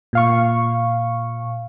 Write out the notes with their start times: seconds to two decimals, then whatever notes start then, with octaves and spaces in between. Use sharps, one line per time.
0.13 A#2 F5 C#6